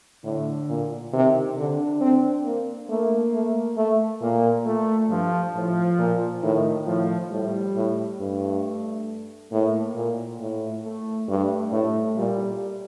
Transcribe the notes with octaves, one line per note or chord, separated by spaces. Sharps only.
A2 D3
A#2
C3 D#3
D3 D4
C4
A#3
A3 A#3
A3
A3
A#2 A#3
A3
G2 F3
A2 F3
A#2
A2 D#3
A2 F3
A2 G3
A2
G2 A3
A2 A#3
A#2
A2
A3
G2 A3
A2 A3
A#2 G3